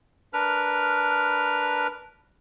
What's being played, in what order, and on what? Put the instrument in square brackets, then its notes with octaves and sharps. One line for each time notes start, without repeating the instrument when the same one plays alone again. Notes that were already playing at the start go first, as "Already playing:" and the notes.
[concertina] D4 A#4 B4 F6